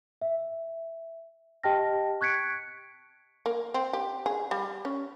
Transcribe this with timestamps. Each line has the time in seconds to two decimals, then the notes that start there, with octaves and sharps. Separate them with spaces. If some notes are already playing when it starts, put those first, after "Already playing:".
0.22 E5
1.63 G4 D#5 G5 A5 F6 A#6
2.21 C#6 F#6 G#6 B6 C#7 D7
3.46 A#3
3.74 C4
3.93 G4
4.26 G#4
4.51 G3
4.85 C#4